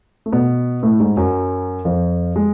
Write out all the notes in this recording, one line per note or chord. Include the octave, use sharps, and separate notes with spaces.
A3
B2 B3
A2 A3
G#2 G#3
F#2 F#3
F2 F3
G#3